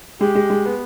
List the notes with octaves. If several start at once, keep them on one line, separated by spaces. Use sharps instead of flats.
G#3 G4
G#3
G#3
B3